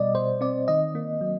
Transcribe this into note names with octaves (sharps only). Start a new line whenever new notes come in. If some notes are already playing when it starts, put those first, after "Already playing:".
Already playing: B2 G3 D5 D#5
B2 C5
C4 D5
D#3 D#5
A#3
F#3